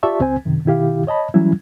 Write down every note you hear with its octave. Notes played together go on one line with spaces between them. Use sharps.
F4 G4 D5 E5 A5 C#6
C#2 C4 C5 G#5
F#2 C3 D#3
B2 D#3 E4 G4 F5
C#5 D#5 A5 B5
E3 F#3 G3 C#4 E4